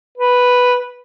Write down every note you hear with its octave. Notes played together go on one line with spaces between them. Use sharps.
B4